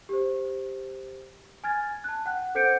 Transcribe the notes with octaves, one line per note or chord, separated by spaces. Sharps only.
G4 C5
G#5 F6 G#6 A6
A5 F#6
F#5 G5 F#6
A4 C5 F#5 G6 C#7 D7